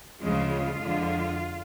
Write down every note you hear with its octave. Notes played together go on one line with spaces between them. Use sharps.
D2 C#3 F3 G#3 F4
F2 D3 F3 G#3